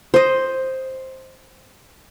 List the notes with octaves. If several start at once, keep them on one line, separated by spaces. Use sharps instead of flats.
C5 D#5